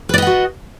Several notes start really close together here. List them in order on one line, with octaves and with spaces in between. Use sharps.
B4 D5 D#5 F#5 F#4